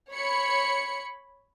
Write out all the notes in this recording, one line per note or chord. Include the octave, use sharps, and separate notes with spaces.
C#5 B5 C#7